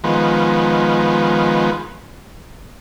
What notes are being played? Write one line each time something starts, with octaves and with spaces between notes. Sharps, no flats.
D#3 F3 G#3 B3